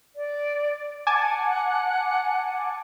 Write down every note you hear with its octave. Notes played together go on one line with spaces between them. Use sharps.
D5
F#5 G#5 A5 D6